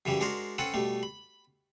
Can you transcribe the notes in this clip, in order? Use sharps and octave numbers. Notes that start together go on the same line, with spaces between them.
F#2 C#3 E3 G3
G#3 D4 F#4 A#4 C5
C4 C#4 A4 B4 F#5
B2 G3 A3
B5